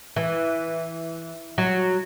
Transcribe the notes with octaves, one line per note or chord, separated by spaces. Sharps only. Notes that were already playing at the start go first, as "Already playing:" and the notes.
E3
F#3